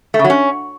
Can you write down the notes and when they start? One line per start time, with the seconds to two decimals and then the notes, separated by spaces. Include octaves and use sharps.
0.14 A3
0.19 C#3
0.24 F#3
0.30 C#4